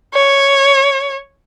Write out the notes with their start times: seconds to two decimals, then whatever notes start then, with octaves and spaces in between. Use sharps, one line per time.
0.14 C#5